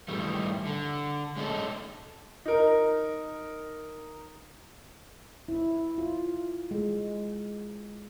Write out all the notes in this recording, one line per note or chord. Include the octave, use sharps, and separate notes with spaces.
G2 D#3 E3 G3 A3
D3
G#3 C#4 D#4 A4
D#4 A#4
E4
F4
G#3